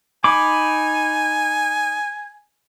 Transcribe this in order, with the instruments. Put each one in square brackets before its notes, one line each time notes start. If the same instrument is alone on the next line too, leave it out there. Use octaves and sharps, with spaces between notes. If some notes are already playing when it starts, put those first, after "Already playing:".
[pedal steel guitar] D#4 B5 D6 [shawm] G#5